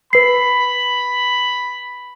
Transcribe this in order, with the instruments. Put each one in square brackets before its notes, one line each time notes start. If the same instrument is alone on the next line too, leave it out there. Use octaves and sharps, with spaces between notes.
[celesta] B4 C7 [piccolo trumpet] B5